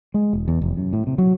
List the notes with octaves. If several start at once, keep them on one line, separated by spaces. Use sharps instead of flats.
G#3
E1
E2
F1
F#2
A2
C3
F#3